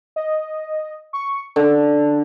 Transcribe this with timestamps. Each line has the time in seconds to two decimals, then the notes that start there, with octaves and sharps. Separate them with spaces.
0.16 D#5
1.13 C#6
1.56 D3 A4